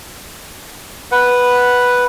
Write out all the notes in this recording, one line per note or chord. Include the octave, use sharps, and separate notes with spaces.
B4 F#5